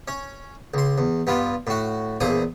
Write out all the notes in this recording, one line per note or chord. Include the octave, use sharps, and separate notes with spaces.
C#4
C#2 C6
E2
G2 B3 F4
A2 F#4
A#1 E2 A#2 G#4 D#6